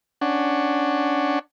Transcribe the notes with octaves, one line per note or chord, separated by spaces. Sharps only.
C#4 D4 F#5